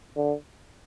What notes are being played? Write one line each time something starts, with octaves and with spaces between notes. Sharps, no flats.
D3